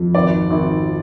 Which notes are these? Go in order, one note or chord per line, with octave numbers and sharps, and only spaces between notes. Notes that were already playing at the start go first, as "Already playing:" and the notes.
Already playing: F2
G#1 D5
G#1